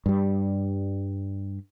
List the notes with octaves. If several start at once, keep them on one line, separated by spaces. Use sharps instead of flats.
G2 G3